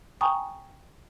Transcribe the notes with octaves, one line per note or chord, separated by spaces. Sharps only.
G5 G#5 A#5 C#6 D#6